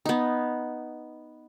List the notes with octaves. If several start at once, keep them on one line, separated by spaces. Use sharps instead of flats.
B3 D#4